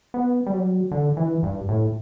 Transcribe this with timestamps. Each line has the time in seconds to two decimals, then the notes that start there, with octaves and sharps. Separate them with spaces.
0.14 B3
0.47 G3
0.53 F#3
0.91 D3
1.17 E3
1.43 G2
1.69 A2